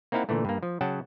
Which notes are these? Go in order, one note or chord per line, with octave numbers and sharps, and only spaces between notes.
A#3 C4 D#4 E4 F5 F#5
A#2 D3 E3 A3
G2 A#3
F3
C#3 F#3 F#5 G5 A5